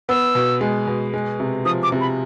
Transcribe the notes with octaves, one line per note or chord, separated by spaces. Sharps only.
B3 E6
B2
G#3
B2
G#3
C3
F3 D#6
D6
C3
B5